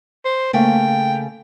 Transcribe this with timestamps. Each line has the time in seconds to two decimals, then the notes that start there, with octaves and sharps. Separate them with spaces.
0.25 C5
0.53 C#3 A3 A#3 G5